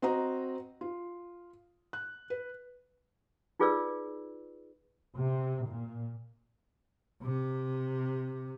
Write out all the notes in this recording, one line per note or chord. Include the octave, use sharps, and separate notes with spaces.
C4 F#4 D#5 A#5
F4
F#6
B4
D#4 F4 G#4 B4 D5 E6
C3
A#2
C3